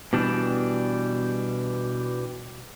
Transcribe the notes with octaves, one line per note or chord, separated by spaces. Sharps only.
B2 E3 G3 D4